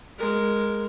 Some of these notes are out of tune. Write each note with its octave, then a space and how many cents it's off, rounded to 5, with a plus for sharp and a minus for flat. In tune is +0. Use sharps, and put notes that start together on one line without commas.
G#3 +0 A#4 +0